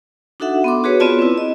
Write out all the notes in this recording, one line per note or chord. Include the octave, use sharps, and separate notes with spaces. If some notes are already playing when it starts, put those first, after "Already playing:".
D4 D#4 F#4 A4 E5 F#5
B3 C6 D6
F#4 G#4 B4 C#5
B3 C4 F4 D5 A5
C4 E4
D#5